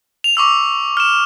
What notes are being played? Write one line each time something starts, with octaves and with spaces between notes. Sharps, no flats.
F7
C#6 D6 E6 F7
F6 E7